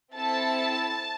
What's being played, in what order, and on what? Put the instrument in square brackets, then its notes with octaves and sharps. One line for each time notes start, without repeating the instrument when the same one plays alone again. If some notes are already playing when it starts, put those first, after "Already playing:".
[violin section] C4 E4 A4 A5